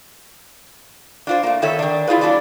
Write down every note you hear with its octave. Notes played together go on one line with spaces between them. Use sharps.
D4 F4 C5
A3 A#3
D#3 B3 A4 C#5 E5
D#3 D4
E4 F4 G#4 B4
F#3 A#3 D4 E4 D5